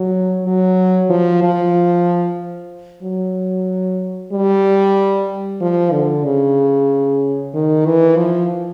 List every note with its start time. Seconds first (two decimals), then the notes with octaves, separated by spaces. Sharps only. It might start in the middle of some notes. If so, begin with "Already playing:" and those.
Already playing: F#3
0.45 F#3
1.10 F3
1.43 F3
3.03 F#3
4.32 G3
5.61 F3
5.92 D3
6.25 C#3
7.54 D#3
7.86 E3
8.17 F3